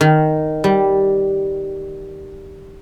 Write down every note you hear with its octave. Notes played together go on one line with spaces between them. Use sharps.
D#3
G3